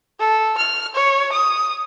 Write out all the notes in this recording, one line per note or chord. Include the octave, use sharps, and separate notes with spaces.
A4
F6
C#5
D#6